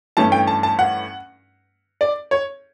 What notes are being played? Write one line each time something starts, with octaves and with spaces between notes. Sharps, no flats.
G2 E3 A3 C#4 A5
G5
A5
A5
F#5
D5
C#5